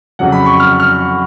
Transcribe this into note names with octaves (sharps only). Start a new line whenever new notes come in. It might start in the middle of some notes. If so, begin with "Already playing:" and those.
F2 C#3 F#3 F#5
B5
C#6
F6
F6